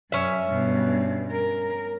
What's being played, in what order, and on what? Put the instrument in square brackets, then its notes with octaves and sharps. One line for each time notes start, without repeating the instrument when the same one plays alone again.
[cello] F#2 [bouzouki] C#4 E5
[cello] G2 B2
A#4